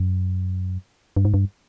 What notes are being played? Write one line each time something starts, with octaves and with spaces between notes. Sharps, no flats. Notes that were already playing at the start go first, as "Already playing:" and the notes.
Already playing: F#2
G2
G#2
G2